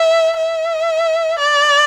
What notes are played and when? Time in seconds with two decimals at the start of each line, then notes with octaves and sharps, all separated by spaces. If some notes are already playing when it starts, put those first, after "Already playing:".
Already playing: E5
0.37 E5
1.39 D5